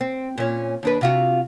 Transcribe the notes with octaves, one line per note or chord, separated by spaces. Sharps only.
C4
A#2 C#4
D#2 D4 B4
C3 F4 F#4